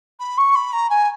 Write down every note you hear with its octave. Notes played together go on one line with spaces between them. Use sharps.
B5
C#6
B5
A#5
G#5